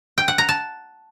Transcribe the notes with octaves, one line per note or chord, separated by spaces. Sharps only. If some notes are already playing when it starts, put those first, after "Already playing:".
G5
F#5
A#5
A5